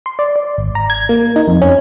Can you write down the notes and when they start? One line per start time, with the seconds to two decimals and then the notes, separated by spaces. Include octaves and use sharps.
0.06 C6
0.19 D5
0.36 D5
0.58 G#1
0.75 A#5
0.90 G#6
1.09 A#3
1.36 D#4
1.48 F2
1.62 C#4